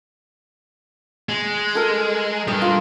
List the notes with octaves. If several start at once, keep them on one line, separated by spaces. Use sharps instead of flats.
G#3
A4 A#4
G2 G3 D#5
F4